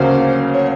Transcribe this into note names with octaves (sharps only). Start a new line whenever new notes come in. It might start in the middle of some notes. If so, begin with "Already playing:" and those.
Already playing: D2 C#3 F#3 A#3 C#4 C5
C#5